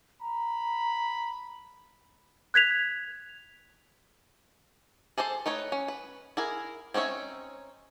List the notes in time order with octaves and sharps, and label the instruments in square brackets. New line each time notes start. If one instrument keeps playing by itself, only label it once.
[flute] A#5 [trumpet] B5
[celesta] F#6 G#6 B6 F7
[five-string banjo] G#4 A4 C5 D5 A5
A3 D#4 B4 C#5
C#4
B4
E4 G#4 A#4
C4 C#4 D#4 C#5 E5